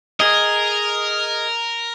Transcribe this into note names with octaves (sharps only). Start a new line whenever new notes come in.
G#4 A#4 D#5